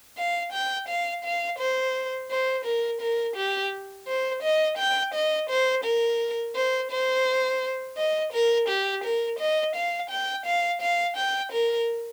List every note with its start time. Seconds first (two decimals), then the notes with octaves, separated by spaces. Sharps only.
0.18 F5
0.52 G5
0.88 F5
1.24 F5
1.59 C5
2.31 C5
2.65 A#4
3.01 A#4
3.36 G4
4.07 C5
4.43 D#5
4.78 G5
5.14 D#5
5.49 C5
5.84 A#4
6.55 C5
6.91 C5
7.98 D#5
8.33 A#4
8.69 G4
9.04 A#4
9.39 D#5
9.75 F5
10.10 G5
10.46 F5
10.81 F5
11.17 G5
11.52 A#4